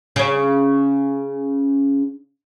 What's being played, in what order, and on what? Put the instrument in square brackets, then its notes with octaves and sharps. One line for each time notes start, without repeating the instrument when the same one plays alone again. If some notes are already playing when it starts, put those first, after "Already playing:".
[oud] C#3 C#4